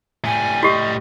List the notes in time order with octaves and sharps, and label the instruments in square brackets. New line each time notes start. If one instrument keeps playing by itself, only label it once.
[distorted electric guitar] A2 G3 [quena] G#5
[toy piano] F#4 G4 [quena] D#5